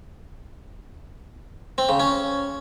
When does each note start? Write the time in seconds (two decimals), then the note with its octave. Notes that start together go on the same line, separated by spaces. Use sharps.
1.78 C4
1.89 C#3
2.00 C#4